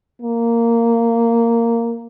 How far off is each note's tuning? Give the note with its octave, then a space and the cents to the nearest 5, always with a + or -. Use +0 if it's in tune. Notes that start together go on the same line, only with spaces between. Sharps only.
A#3 -10